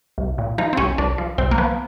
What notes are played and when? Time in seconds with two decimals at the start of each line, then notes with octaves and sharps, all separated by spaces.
0.18 C2
0.38 A#2
0.58 F3 D#4
0.73 C4
0.77 C2 C#4
0.98 C2 D4
1.18 F3
1.38 C2 C4
1.51 A#3
1.58 F3 B3